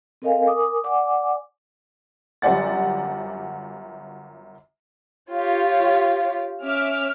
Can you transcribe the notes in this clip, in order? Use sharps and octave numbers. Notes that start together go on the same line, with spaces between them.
C4 A4 A#4 D#5 F5 G#5
A#4 G#5 D6 D#6
D5 F#5 G#5 D6
G1 F#2 G4 D5 F#5 A6
F4 G4 C#5
C#4 E5 D6 F6